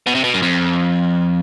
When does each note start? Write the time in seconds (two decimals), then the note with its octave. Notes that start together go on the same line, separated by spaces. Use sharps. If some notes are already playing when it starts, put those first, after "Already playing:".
0.07 B2
0.15 C3
0.24 B2
0.34 F#2
0.42 F2